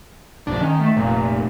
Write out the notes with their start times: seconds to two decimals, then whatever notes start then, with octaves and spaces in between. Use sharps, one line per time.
0.47 B1 G2 F3 D4
0.61 D#3 C#4
0.80 A3
0.97 F1 A#2